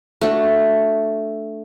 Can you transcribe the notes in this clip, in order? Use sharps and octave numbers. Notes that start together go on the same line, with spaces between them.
A3 D4 F#4